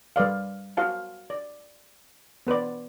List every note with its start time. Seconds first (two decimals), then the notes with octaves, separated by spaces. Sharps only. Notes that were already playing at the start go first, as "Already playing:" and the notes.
0.16 G3 B4 D5 F5
0.77 F#4 C5 F5 A5
1.30 D5
2.47 B3 B4 C5 D5